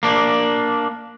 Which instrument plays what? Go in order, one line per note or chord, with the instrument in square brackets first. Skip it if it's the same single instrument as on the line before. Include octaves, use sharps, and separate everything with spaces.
[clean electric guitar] A#3 D4